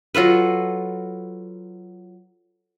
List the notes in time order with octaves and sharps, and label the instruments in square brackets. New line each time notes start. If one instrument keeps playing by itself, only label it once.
[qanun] F#3 F4 A4 B4